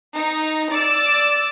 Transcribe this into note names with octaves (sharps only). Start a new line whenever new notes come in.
D#4
D5 E6